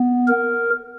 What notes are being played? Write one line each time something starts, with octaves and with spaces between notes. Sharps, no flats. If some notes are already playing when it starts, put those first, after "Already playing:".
Already playing: B3
A#4